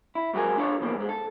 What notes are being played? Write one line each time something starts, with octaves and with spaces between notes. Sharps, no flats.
E4
G#2 F#3 G#3 G4 A#4 G#5
D4 F4 A4 C#5
F2 B2 E3 A3 A#3
G#2 G#3
A4